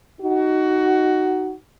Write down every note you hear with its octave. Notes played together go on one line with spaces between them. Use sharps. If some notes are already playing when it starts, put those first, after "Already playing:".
D#4 F#4